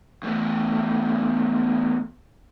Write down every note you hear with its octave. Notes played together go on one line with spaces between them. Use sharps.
E2 A3